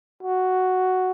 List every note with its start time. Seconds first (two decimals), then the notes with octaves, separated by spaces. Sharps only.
0.23 F#4